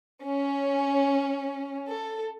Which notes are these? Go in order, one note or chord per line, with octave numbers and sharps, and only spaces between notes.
C#4
A4